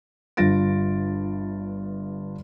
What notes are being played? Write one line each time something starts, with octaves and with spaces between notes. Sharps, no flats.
G1 G2 F4 A6 A#6 D7